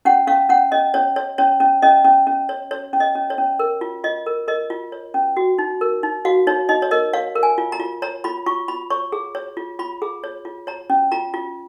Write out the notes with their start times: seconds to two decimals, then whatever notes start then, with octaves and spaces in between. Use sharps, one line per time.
0.05 C#4 F#5
0.27 C#4 F5
0.49 C#4 F#5
0.72 C#4 D#5
0.94 C#4 C#5
1.16 C#5
1.38 C#4 C#5
1.60 C#4
1.82 C#4 D#5
2.05 C#4
2.27 C#4
2.49 C#5
2.71 C#5
2.93 C#4
3.00 D#5
3.15 C#4
3.30 C#5
3.38 C#4
3.59 A#4
3.81 F4
4.04 F4 D#5
4.26 A#4
4.48 A#4 D#5
4.70 F4
4.92 C#5
5.14 C#4
5.37 F#4
5.59 D#4
5.81 A#4
6.03 D#4
6.25 F#4 F5
6.47 D#4 C#5
6.69 D#4 D#5
6.82 C#5
6.91 A#4 D#5
7.13 C#5 F5
7.36 A#4
7.43 G#5
7.58 F4
7.72 A#5
7.80 F4
8.02 C#5 A#5
8.24 F4 B5
8.46 F4 C#6
8.68 F4 B5
8.90 C#5 C#6
9.12 G#4
9.35 C#5
9.57 F4
9.79 F4 B5
10.02 G#4
10.24 C#5
10.45 F4
10.67 C#5 A#5
10.90 C#4
11.12 F4 A#5
11.34 F4